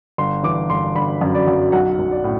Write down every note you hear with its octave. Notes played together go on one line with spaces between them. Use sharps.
G1 C6
E3 D6
G1 C6
G1 B5
F#2
D5
F#2
B1 F#5
B1
D5
A2